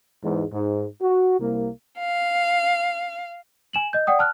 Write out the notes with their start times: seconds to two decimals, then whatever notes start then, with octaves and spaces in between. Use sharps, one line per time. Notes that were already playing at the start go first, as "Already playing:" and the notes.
0.24 E2 G#2
0.53 G#2
1.02 F#4
1.40 C2 A#3
1.98 F5
3.73 G#5 E7 F#7
3.93 D#5 G6
4.07 D5 F#5 G5 D#6
4.19 A5 F6 F#6